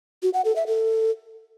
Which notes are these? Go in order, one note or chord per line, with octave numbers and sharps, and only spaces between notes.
F#4
F#5
A4
E5
A4